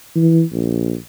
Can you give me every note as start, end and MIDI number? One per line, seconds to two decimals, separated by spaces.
0.16 0.43 52
0.53 0.95 34